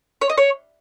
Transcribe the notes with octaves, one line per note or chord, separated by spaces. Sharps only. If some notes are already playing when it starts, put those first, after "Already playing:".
C#5
D#5
C#5